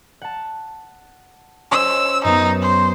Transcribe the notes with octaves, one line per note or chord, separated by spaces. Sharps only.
F#5 A5
C#4 C5 D#5 E6
F#2 B3 D#4
C5